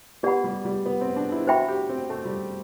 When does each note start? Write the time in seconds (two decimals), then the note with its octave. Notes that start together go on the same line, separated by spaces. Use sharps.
0.23 B3 G4 D5 F#5 B5
0.44 G3
0.65 G3
0.86 B3
1.01 C4
1.16 D4
1.32 E4
1.47 F#4 C5 E5 G5 B5
1.68 G4
1.89 C4
2.10 A3
2.25 G3